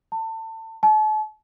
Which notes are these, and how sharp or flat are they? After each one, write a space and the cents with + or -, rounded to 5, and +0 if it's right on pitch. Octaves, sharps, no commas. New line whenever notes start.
A5 +30
A5 -40